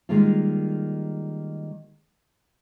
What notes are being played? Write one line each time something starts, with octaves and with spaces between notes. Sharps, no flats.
D#3 G3 G#3 A#3 F4